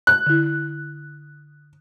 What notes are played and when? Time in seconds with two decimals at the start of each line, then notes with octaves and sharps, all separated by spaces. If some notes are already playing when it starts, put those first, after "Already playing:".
0.07 F#6
0.26 D3 E4